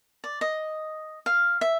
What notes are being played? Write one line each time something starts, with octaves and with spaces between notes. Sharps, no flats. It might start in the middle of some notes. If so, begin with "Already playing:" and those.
D5
D#5
F5
E5